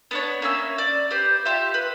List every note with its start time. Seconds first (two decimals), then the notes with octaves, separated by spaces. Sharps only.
0.11 B3 D4 C#5
0.42 A#3 C#4 E5 E6
0.78 D5
1.11 G4 B4 C5
1.45 F4 G4 E5
1.74 B4